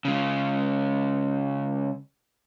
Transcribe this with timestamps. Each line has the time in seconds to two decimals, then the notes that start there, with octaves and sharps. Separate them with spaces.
0.05 C#3 G#3